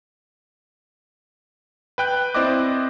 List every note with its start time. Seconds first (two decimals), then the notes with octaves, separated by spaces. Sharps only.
1.98 B4 G5 F#6
2.34 C4 E4 C5 D5 D#5 D6